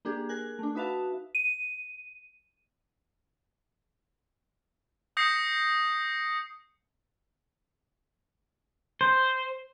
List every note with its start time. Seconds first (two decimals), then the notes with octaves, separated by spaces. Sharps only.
0.05 A#3 D4 G4 G#4
0.29 G#4 A#4 G#5 F#6
0.59 A3 D4
0.75 D#4 F#4 B4 E5 F5 A5
1.35 D#7
5.17 D#6 G6 A#6 C7 C#7
9.01 C5